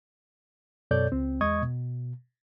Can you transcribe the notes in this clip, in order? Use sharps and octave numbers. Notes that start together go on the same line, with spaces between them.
F#2 B2 A4 C#5 D5 G6
C#2 C4
E2 G#3 D#5 C#6 D#6 G#6
B2